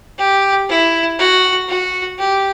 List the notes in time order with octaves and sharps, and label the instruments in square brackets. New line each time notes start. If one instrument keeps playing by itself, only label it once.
[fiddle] G4
E4
F#4
F#4
G4